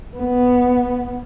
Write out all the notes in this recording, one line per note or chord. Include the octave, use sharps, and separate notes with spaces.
B3